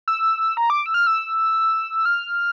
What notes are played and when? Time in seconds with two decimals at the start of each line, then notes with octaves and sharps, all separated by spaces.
0.08 E6
0.57 A#5
0.70 D6
0.86 E6
0.94 F6
1.07 E6
2.05 F6